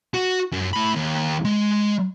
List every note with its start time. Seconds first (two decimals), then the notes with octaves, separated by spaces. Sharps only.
0.14 F#4
0.52 F#2
0.73 A2 B5
0.96 D#2
1.45 G#3